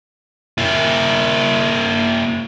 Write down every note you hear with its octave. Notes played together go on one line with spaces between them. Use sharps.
A#3 E4